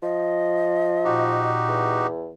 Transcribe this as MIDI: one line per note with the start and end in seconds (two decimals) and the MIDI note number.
0.03 1.58 53
0.03 1.51 75
1.05 2.08 46
1.05 2.07 63
1.05 2.07 66
1.05 2.07 67
1.68 2.33 40